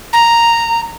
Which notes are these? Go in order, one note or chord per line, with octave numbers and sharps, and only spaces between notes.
A#5